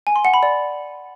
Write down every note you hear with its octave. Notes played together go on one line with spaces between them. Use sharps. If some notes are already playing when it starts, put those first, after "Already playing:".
G#5
C6
F#5
B5
D5